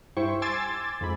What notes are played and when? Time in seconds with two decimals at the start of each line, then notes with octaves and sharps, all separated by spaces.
0.17 G2 E4 C5 G5 C#6
0.42 G#5 C6 D6 E6 G#6 A6
1.01 F2 G#2 B5